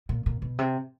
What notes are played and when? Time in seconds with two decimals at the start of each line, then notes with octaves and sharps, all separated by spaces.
0.09 A#2
0.26 A#2
0.42 B2
0.59 C3